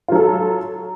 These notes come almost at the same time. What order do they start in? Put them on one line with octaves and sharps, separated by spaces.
F4 F#3 A4